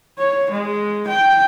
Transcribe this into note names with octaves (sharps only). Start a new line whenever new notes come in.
C#5
G#3
G5